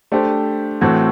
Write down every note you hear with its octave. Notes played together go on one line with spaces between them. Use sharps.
A3 D4 G4 C5
A2 E3 A3 C4 F#4